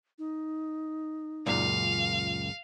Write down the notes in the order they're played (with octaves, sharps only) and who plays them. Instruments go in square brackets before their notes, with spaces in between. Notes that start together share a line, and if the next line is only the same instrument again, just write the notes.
[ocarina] D#4
[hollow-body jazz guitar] C#2 F#2 A#2 [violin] F5